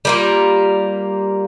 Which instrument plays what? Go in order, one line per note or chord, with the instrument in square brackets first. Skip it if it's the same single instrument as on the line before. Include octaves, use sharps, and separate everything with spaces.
[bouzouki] G3 A#3 F4